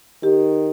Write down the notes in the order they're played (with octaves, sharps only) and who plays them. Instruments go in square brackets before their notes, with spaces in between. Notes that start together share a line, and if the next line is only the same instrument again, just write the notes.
[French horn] D#3 [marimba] G4